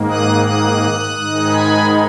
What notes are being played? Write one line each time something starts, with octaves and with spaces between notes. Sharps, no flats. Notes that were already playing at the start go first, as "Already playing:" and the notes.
Already playing: G#2 D#3 A#3
D#6 F#6
D#6 F#6
G#2 D#3 G#3 D#4
G#5 B5